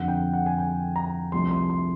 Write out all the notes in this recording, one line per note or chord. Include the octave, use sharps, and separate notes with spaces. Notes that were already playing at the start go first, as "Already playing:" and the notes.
Already playing: F2 D3 F3 F#5
G5
F#5
G#5
G5
A#5
C2 C3 F3 A3 C6
C6
C6